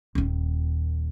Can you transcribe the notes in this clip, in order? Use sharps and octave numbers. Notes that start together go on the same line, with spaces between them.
D#1 D#2